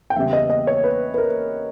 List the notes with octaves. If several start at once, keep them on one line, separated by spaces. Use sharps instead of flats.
G5
E2 C#3 G3 E5
D#5
D#5
C#5
B4
B4
A#4